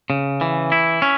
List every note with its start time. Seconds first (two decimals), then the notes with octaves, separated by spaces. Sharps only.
0.10 C#3
0.41 E3
0.72 E4
1.02 C#4